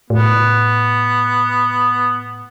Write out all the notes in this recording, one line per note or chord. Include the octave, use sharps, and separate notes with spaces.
A2 B3